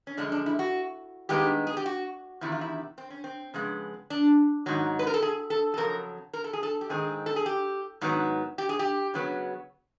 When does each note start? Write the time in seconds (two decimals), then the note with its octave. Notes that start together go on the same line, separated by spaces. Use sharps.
0.07 C#4
0.17 F#2 D3 F3 G#3 D4
0.32 D4
0.46 E4
0.59 F#4
1.29 G2 D#3 G#3 B3 G4
1.67 G#4
1.77 G4
1.86 F#4
2.41 E2 C3 D#3 E4
2.52 F4
2.61 E4
2.98 C4
3.10 C#4
3.24 C4
3.54 F2 C#3 G#3 B3
4.10 D4
4.66 G#2 D#3 F#3
4.99 B4
5.07 A#4
5.14 A4
5.22 G#4
5.50 A4
5.74 A4
5.77 F2 C#3 F#3 A#4
6.33 A#4
6.44 A4
6.53 G#4
6.63 A4
6.81 G4
6.89 G#2 D#3 G#3 C4 G#4
7.26 A4
7.36 G#4
7.46 G4
8.01 G#2 D#3 F#3 B3
8.58 G4
8.69 G#4
8.79 G4
9.14 C#3 F#3 B3